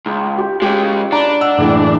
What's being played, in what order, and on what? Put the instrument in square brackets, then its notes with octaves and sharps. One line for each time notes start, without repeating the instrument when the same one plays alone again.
[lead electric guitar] C#2
[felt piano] G4
[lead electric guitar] C#3 G#3 [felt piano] G4
[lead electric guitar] D4 [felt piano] A#5 B5
[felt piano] D#5 F#5 E6
F#1 A2 E3